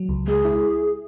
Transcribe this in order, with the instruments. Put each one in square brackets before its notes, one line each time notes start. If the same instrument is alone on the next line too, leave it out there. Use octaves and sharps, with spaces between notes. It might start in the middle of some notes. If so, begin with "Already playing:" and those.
Already playing: [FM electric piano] F#3
C#2
[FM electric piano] G#3 [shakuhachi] G#4
[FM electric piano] E4